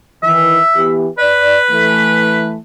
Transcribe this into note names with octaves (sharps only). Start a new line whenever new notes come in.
D#3 E3 E5
E3 B3 G4
B4 D5
E3 A3